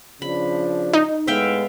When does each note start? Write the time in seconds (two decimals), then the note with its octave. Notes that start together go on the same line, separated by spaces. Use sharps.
0.22 C#3 F3 D4 B5
0.93 D#4
1.27 A2 G#3 B3 E5 F5 G5